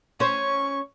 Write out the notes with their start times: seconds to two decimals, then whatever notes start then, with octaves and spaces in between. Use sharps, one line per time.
0.20 C#4 C5 C#6